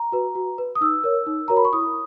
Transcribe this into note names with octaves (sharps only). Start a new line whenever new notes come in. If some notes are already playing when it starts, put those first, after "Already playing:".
Already playing: A#5
F#4 B4
F#4
B4
D#6
D#4 E6
A#4 C#5
D#4
F#4 A#4 C#5 A#5
B5
C#6
E4 D#6